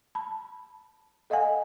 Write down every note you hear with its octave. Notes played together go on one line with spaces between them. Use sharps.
A5 B5
A4 D#5 F5 F#5 G#5